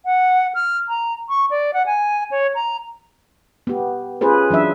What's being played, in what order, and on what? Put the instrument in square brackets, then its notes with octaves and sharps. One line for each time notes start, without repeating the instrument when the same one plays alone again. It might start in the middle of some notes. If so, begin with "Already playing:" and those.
[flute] F#5
F6
A#5
C#6
D5
F#5
G#5
C#5
A#5
[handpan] B3 G4
C#4 F4 G#4 B4 C5
E3 F#3 D4 E5